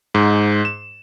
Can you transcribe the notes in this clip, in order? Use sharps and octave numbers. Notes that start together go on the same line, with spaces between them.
G#2
E7